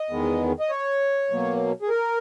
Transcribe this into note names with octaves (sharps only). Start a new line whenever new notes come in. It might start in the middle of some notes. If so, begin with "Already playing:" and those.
Already playing: D#5
E2 D#3 G#3 B3
D#5
C#5
B2 F#3 A#3
G#4
A#4